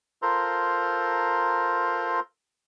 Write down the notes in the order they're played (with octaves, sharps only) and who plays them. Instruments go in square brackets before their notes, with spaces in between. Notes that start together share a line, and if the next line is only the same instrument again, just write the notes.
[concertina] F4 A4 A#4 C5 A#5 C6